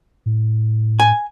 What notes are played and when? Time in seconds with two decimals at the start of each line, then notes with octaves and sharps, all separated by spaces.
0.26 A2
1.00 G#5